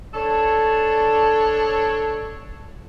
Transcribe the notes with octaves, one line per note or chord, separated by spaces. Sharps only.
D4 A4 C#5